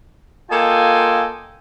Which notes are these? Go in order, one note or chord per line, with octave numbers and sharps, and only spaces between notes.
A#3 F4 A4 D#5 G5 G#5